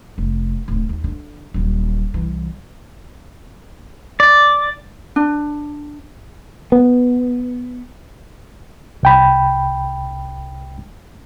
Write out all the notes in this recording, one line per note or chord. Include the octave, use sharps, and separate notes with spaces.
F1
D1 C#3
D#2
D3
D#1 F#3
C2 E3
D5
D4
B3
C2 G5 B5